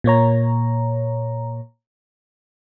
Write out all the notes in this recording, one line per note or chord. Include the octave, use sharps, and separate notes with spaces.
A#2 A#3 C#5 A#5